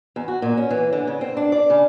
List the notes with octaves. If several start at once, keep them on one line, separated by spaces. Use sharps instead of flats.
E2
F#4
A#2
C#4
E3
D3
C#3
C4
D4
D5
C#3